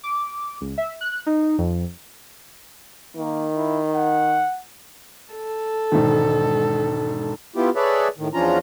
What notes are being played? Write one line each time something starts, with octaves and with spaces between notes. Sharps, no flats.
D6
C#2
E5
F#6
D#4
F2
D#3 A#3
E4
F#5
A4
E1 G#2 D#3
B3 E4 F4 G4
G#4 A4 B4 C#5 D5 E5
A2 D#3
E2 F3 C#4 D4 F4 A#5